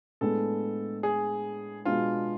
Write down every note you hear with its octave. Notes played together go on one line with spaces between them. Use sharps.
A2 G#3 B3 D4 A4
G#4
B2 G#3 B3 D4 F4